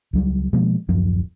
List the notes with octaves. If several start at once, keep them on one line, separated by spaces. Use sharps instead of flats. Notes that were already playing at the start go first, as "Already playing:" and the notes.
C#2 F#3 G3
B2 F3 G#3 A#3
D1 F#2 F3